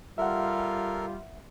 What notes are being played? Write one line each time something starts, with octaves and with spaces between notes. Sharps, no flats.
G3 F4 A4 A#4 E5 F#5